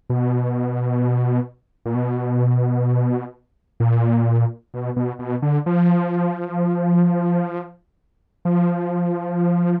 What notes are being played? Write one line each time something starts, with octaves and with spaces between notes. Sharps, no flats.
B2
A#2
B2
A#2
B2
B2
B2
D3
F3
F3